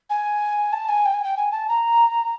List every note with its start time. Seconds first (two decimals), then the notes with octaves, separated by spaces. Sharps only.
0.09 G#5
0.72 A5
0.88 G#5
1.05 G5
1.13 G#5
1.24 G5
1.37 G#5
1.51 A5
1.68 A#5